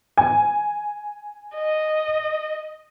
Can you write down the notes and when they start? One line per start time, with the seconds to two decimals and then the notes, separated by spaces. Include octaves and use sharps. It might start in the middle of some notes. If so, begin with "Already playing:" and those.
0.17 G#5
1.54 D#5